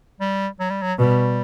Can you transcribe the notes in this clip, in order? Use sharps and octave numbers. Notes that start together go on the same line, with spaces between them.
G3
F#3
G3
F#3
B2 G3